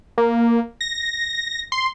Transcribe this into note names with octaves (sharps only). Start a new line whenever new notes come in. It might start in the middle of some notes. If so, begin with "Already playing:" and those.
A#3
A#6
C6